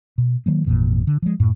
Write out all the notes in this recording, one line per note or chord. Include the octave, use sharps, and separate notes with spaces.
B2
D#3 F#3 A#3
G#1 F2 A#2 E3
D3
F3 G#3
F#2 A2